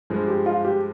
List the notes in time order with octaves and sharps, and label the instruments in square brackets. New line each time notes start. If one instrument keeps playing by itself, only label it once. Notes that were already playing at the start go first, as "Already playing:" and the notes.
[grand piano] G2 F3 G#3
[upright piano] G4
F4
G4